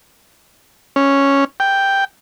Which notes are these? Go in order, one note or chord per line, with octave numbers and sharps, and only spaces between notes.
C#4
G5